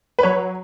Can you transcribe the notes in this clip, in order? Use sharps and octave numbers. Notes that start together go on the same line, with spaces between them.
B4
F#3 C#5